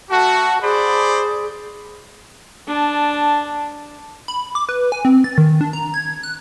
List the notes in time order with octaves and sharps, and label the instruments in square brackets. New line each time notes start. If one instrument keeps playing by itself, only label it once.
[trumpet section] A3 F#4 [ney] A5
[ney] G#4 [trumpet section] C5 D5 B5
[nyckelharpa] D4 A5
[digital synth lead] B5
D6
B4
G#5
C4
A6
D#3
D4
A#5
G#6
F#6